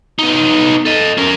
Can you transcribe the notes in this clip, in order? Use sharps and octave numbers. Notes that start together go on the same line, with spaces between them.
B3 D#4
A4 D#5
C#4 A#4